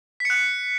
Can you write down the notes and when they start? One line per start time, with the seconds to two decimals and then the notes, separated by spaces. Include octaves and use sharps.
0.20 B6
0.25 C#7
0.30 F#6